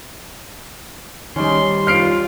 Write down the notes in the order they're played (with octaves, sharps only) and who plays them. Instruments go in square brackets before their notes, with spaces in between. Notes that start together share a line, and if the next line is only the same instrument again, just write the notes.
[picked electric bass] D#3 G3 [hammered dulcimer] C#4 D#4 D5 [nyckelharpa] C6
[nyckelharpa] F4 [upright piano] F6 C7 D7